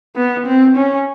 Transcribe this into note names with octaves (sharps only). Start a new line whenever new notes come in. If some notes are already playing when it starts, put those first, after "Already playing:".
B3
C4
C#4